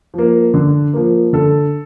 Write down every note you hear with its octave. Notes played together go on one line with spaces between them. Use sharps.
F3 A#3
D3
F3 A#3
D3 A4